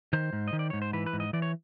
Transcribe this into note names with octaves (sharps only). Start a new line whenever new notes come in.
D#3 C5
G#2
D#5
D#3
D5
G#2 C#5
C5
E3 B4
B4
G#2
D#5
E3 D5
C#5